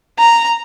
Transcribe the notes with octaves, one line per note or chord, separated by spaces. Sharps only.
A#5